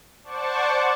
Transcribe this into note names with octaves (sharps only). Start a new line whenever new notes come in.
C5 D5 F#5 A5 C#6 D6